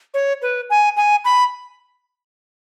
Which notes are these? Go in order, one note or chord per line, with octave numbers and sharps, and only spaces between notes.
C#5
B4
G#5
G#5
B5